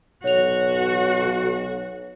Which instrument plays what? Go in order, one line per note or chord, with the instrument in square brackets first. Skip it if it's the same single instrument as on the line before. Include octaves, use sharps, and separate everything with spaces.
[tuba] B1 [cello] F#4 [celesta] C#5 F7